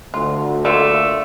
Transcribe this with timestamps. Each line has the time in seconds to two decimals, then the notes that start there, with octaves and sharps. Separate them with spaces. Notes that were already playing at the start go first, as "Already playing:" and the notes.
0.14 D2 F4
0.65 A3 A#3 F4 D5